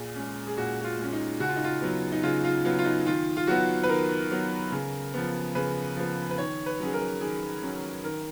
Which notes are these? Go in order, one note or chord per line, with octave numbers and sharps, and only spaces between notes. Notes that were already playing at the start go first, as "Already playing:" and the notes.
Already playing: A#2 G#4
G#3 C#4
G#4
A#2 F#4
F#4
F4
G#3 C#4
D#4
C#3 F#4
F4
D#4
F4
F#3 B3
D#4
C#3 F4
F4
F#3 B3 F4
F4
D#4
D#3 F4
F4
F#3 B3 F#4
B4
D#3 A#4
F#3 B3
C#3
F3 B3
C#3 B4
F3 B3
B4
D#3 C#5
B4
F#3 C#4 G#4
A#4
D#3 G#4
F#3 C#4
D#3 A#4